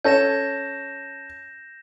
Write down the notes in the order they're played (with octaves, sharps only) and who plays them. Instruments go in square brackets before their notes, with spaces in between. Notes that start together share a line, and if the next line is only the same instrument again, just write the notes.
[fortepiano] C#4 A4 C#5 [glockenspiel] G6 A#6 E7